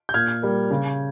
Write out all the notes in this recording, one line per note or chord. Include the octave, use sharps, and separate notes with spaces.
G6
A#2 F6 G#6
G3 A#3
C#3